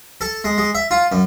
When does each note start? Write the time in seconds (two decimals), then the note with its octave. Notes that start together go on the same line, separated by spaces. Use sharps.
0.21 A4
0.44 G#3
0.58 G#3
0.75 E5
0.91 F4
1.12 F#2